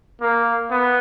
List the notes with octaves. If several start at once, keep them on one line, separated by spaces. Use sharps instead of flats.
A#3
B3